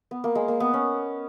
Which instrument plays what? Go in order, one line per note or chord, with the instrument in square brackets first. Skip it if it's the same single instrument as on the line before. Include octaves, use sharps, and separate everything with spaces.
[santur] B3
A#3
G#3
A#3
B3
C#4